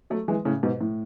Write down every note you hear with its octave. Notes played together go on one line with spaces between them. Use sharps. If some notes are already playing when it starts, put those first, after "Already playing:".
F#3 A3
E3 G#3
A2 C#3
G#2 B2
A2